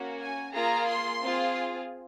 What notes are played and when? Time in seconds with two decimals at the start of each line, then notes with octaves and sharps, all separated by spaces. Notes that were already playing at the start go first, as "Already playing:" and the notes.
Already playing: A#3 C#4 F#4
0.19 G#5
0.54 A#3 F4 G#4 A#5
0.87 C6
1.22 C4 F4 G#4